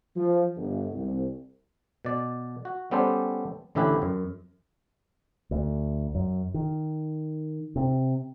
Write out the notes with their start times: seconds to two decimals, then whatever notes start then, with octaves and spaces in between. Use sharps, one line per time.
0.15 F3
0.57 G1
0.92 C2
2.05 B2 D5
2.65 F#4
2.91 G3 B3 C#4 A4 C5 D5
3.75 A1 D3 C#4 E4 G4 B4
4.02 F#2
5.51 D2
6.15 F#2
6.54 D#3
7.76 C3